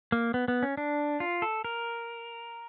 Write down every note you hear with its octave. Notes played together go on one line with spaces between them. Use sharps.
A#3
B3
B3
C#4
D4
F4
A4
A#4